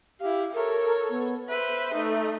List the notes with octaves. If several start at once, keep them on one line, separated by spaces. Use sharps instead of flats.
E4 G4 F5
A4 A#4 C#5
B3
B4 C5 E5
A3 D#4